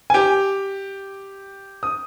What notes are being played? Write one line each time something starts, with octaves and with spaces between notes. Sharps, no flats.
G#5
G4 G5
D#6